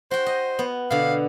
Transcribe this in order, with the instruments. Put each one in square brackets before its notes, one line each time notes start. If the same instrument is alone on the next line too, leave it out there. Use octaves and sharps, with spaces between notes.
[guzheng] F#4 G5 [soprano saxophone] C5
[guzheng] D#5
B3
[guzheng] B2 D3 [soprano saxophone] F5